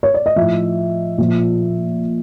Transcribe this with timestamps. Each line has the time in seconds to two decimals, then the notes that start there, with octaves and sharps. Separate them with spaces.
0.03 C#5
0.14 D5
0.26 D#5
0.36 A2 F3 E5
1.18 A#2 F3